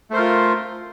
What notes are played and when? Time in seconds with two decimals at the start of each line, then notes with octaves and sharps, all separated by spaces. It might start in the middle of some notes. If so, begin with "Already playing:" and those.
0.10 A3
0.13 C5
0.16 A#4
0.19 F4